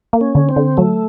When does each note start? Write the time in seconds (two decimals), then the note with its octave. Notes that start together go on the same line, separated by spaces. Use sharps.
0.13 A#3
0.21 C#4
0.35 D3
0.49 C4
0.56 D3
0.77 F#3 A3